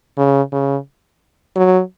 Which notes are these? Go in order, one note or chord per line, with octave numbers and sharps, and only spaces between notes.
C#3
C#3
F#3